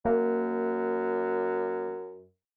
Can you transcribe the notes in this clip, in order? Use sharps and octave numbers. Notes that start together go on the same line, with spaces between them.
F#2 A#3